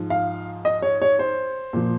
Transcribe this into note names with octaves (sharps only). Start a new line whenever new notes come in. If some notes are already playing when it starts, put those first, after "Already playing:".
Already playing: G#2 F3
F5
D#5
C#5
C#5
C5
A#2 F3